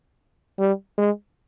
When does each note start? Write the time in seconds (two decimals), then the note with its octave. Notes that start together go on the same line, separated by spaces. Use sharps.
0.59 G3
0.98 G#3